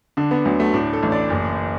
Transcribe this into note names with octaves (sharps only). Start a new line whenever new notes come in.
D3 D4
B3
D2 F#3
A3
A2 D4
A4
A1
D5
F#1